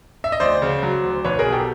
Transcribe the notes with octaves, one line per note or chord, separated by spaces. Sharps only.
E5
D#5
D2 C5 D5
C#3
F#3
D2
B1 B4 C#5
G#4 A#4
B2
G4 A4